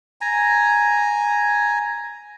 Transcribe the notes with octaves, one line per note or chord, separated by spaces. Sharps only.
G#5 A#5